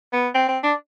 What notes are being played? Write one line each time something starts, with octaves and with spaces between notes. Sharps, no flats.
B3
C4
C4
D4